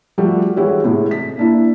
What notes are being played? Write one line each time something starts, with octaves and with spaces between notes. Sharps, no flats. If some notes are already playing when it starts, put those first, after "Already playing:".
F3 G3 A3 F#4
E3 G#3 E4 F#4 G4 C#5
A2 C3 G#3
B6
A#3 D4 E4